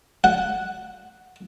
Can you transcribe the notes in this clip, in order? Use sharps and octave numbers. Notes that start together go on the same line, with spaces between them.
F#5